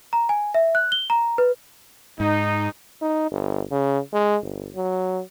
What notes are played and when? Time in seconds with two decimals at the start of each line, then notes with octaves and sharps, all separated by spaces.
0.13 A#5
0.29 G#5
0.54 E5
0.75 F#6
0.92 G7
1.10 A#5
1.38 B4
2.20 G#2 D#4
3.01 D#4
3.31 G1
3.70 C#3
4.13 G#3
4.42 G1
4.75 F#3